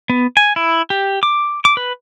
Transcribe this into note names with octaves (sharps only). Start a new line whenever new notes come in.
B3
G#5
E4
G4
D6
D6
B4